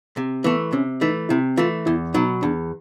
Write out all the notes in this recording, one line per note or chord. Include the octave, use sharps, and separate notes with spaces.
C3
E3 A3 B3
C3 C#4
E3 A3 D#4
C3 E4
E3 A3 F4
E2 E4
B2 F#3 D#4
E2 D4